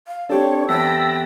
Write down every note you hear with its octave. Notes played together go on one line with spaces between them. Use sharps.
F5
C4 D4 G4 A4 C#5
E2 G5 A5 B5 E6 A#6